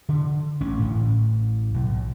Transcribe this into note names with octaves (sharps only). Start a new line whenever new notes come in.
D3
A1 C#4
A1 A2
B1